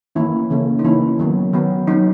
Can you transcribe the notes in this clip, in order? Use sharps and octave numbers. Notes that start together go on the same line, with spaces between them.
D#3 E3 A#3 C#4 E4
C#3 E3 A#3 C#4
D#4
C#3 E3 A#3 C#4 E4
D#3 F#3 B3
D#3 F#3 B3
F#3 C#4 D#4